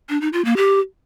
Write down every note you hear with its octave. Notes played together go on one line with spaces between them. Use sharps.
D4
D#4
F4
A#3
G4